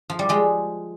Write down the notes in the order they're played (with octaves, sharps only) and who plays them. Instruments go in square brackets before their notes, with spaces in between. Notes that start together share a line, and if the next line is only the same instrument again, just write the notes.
[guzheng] F3
G3
F3 G#3